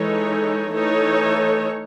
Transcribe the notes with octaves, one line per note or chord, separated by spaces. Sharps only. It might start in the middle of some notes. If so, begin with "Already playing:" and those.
Already playing: E3 G#3 D#4 A4 C#5
E3 A3 D#4 A4 C#5